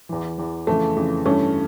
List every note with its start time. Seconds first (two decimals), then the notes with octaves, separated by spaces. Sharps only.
0.09 E2 E3
0.38 E2 E3
0.67 F2 C#3 E3 A3
0.96 F2 C#3 E3
1.25 G2 E3 A3 C#4